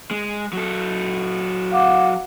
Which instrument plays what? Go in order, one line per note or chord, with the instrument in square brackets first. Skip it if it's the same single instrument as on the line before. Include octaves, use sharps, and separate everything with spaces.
[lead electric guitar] G#3
F#3 A4
[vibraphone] F5 F#5 D6